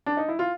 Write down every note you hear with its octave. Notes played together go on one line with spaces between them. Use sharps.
D4
D#4
E4
F4